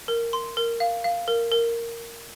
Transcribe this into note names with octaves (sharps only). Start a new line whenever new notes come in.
A#4
C6
A#4
F5
F5
A#4
A#4